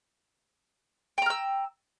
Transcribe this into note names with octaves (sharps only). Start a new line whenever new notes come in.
G5 A#5 E6 F6